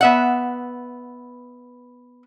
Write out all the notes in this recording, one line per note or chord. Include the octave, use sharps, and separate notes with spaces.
B3 E5 F#5